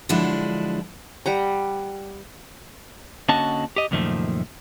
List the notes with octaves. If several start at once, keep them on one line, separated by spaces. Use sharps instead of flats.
D3 F3 F#3 G#3 D4 E4
G3 F#5 A#5
D3 A#3 C#4 F#4 D#5 A5
G4 D#5
C#2 F#2 A#2 D#3 F3 A3